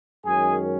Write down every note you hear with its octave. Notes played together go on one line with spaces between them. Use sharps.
F#2 D#3 G#3 C#4 G#4 G#5